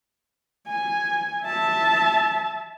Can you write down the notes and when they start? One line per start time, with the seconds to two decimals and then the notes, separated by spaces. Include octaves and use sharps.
0.68 G#5
1.43 E5 A5